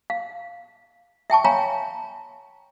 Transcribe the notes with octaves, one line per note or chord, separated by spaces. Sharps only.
F5
E5 G5 A5 C#6
C#5 F5 G5 G#5 A#5 B5